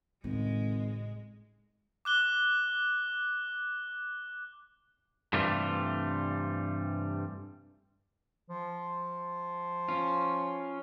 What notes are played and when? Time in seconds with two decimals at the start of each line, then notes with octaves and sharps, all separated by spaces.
0.24 G#1 A2 C#3 G#3
2.05 D6 F#6 G7
5.33 G2 C3 E3 G3 A3 F4
8.49 F3
9.89 C#4 F4